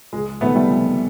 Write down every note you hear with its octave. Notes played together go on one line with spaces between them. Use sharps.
C#2 G#3
C3 D#3 A3 B3
G3 A3
C#2